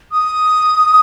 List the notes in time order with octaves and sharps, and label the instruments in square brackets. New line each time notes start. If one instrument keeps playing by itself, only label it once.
[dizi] D#6